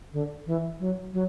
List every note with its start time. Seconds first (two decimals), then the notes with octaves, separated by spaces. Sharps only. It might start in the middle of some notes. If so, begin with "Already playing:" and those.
0.13 D3
0.46 E3
0.80 F#3
1.14 F#3